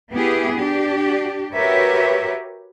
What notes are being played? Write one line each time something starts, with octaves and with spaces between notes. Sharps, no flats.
B3 E4 G4 G#4
D4 G4
F#4 G4 A#4 B4 C#5 E5